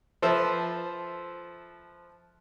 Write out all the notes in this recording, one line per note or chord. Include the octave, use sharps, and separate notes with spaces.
F3 A4 B4 C5 E5